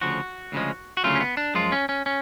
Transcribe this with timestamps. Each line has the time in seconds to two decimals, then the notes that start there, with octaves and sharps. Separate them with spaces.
0.01 D2 C#3 F3 F#4
0.52 D2 C#3 F3 G#3
0.97 F#4
1.04 D2 C#3 F#3 A3 F4
1.15 C#4
1.20 B3
1.37 D4
1.54 F#2 F3 G#3 F4
1.72 C#4
1.89 C#4
2.06 C#4